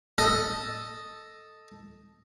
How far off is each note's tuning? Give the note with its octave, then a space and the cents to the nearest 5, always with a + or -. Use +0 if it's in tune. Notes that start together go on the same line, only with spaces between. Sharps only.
A4 +0 D#5 +0